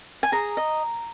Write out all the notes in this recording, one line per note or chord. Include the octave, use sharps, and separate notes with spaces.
G#5
G#4 A#5
D#5